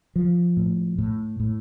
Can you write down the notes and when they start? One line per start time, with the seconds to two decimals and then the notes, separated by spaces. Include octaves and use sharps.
0.16 F3
0.57 A2
0.98 A2
1.40 A2